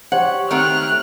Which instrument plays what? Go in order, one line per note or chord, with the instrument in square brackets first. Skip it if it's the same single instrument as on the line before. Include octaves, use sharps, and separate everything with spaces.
[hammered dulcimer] G4 C5 C#5 [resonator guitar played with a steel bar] F#5
[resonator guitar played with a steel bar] D#3 A3 C4 [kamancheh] F6 F#6